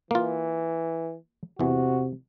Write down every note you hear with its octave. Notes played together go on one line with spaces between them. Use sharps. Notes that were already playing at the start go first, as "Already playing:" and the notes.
E3 A#3 F4
E2 C3 E3 F#4